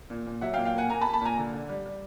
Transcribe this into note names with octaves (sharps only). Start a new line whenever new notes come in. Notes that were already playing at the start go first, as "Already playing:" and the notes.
A#2
A#2
F#3 E5 F#5
F5 G5
A#2
F5 G5
A#3 F#5 G#5
A#3 G#5 A#5
A5 B5
A#3
A5 B5
A#2 G#5 A#5
D3
D3
G3
G3